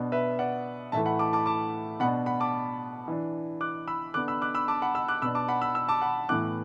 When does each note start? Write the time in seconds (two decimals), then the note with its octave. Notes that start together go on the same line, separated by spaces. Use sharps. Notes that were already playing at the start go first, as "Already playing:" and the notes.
Already playing: B2 B3 D4
0.12 B4 E5
0.39 D5 F#5
0.92 A2 E3 A3 E5 A5
1.06 F#5 B5
1.19 A5 D6
1.33 A5 D6
1.46 A5 D6
2.00 B2 B3 D4 F#5 B5
2.26 F#5 B5
2.40 A5 D6
3.08 E3 D4
3.61 D6 F#6
3.88 B5 E6
4.14 D3 B3 D4 D6 F#6
4.28 B5 E6
4.42 D6 F#6
4.55 B5 E6
4.68 A5 D6
4.82 F#5 B5
4.95 B5 E6
5.08 D6 F#6
5.22 B2 B3 D4 B5 E6
5.35 A5 D6
5.48 F#5 B5
5.61 B5 E6
5.75 B5 E6
5.89 A5 D6
6.02 F#5 B5
6.29 A2 E3 B3 D6 F#6